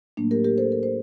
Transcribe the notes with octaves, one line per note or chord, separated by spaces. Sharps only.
A2 F#3 A3 A#3 D4
G4 A#4
G4 A#4
A4 C5
A#4
C5